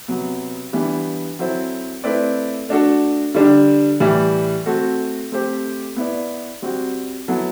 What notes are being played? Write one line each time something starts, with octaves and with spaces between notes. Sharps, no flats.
C3 F#3 B3
E3 G3 B3 D4
F#3 C4 E4 A4 C5
A3 C4 E4 B4 D5
A3 D4 F#4 A4
D3 G3 D4
A2 E3 G3
A3 C4 F#4 A4
A3 C4 G4 C5
B3 E4 B4 D5
G3 C4 F#4
F#3 B3 E4 A4